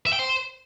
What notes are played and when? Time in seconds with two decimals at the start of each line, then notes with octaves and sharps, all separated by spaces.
0.06 E5
0.13 G5
0.19 C5